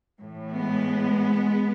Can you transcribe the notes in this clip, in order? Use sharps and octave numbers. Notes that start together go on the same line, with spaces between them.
A2 E3
G#3 B3